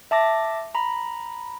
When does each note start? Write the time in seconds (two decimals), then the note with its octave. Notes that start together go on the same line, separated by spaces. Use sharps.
0.11 E5 A5 D6 A#6
0.75 A#5 B5